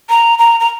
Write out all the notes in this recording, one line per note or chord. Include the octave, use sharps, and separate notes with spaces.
A#5
A#5
A#5